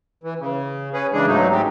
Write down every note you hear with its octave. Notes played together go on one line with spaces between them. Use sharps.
E3
C#3
C#4 G#4 B4
C#3 E3 G#3 D4 G#4
G#2 F#3 A3 D#4
G3 G#3 C4 G4